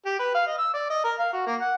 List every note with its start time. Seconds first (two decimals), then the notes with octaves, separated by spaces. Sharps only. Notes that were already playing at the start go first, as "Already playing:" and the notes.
0.06 G4
0.19 B4
0.35 F5
0.47 D#5
0.58 E6
0.74 D5
0.90 D#5
1.04 A#4
1.19 F5
1.33 F#4
1.47 A#3
1.61 F#5